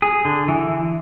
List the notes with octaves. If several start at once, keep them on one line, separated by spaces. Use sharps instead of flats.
G#4
D3
E3